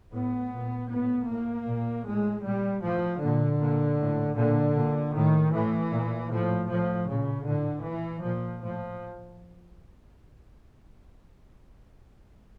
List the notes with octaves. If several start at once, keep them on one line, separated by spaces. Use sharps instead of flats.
A2 B3
A#2
A2 B3
A2 A#3
A#2
A2 G#3
A#2 G3
A2 F3
A#2 D3
A#2
A2
A#2 D3
A#2
A2 D#3
A2 E3
A#2
A2 F3
A2 F3
A#2 C#3
A2 D3
A#2 E3
A#2 F3
A2 F3